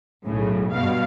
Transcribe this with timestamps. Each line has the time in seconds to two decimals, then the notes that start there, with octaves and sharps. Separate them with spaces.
0.25 B1 A2 C#3
0.73 G2 B2 F5